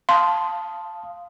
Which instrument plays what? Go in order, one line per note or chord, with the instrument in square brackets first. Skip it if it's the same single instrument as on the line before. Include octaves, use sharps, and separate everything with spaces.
[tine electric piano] F5 A5 D#6 [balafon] C6